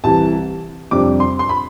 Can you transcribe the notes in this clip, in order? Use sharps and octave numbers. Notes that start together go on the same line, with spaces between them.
C2 C3 E3 A5
F2 C3 G3 D4 D6
C6
C6
B5